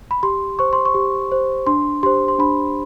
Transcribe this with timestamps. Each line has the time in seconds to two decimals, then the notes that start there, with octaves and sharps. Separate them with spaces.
0.11 B5
0.23 G4 C6
0.59 C5 C#6
0.73 C6
0.85 C#6
0.94 G4
1.32 C5
1.67 D4 C6
2.03 G4 C5 C6
2.28 C6
2.39 D4 B5